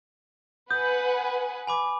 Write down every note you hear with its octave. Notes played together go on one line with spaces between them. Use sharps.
B4 F#5 G#5 D#6 G6
G#5 B5 D6